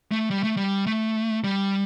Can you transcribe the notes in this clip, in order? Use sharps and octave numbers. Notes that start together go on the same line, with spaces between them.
A3
G3
A3
G3
A3
G3